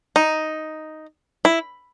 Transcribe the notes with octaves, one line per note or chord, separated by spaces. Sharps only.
D#4
E4